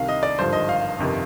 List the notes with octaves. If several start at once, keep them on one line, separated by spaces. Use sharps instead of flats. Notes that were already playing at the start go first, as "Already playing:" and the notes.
Already playing: C2 C3 D#3 F5
D#5
D5
G#1 G2 D3 F3 C5
D#5
F5
G1 F2 C3 D#3